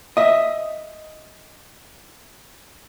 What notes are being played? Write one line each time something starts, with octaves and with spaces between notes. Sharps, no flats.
D#5 E5